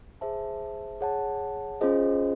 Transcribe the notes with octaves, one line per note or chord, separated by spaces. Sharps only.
G#4 C5 E5 A5
G#4 C#5 F#5 A5
C#4 F4 G#4 C5 D#5